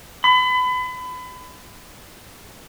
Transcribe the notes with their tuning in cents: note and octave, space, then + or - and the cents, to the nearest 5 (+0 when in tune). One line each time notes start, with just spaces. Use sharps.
B5 +30